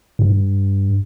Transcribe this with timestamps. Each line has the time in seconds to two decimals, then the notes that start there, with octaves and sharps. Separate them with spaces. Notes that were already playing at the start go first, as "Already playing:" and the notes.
0.19 G2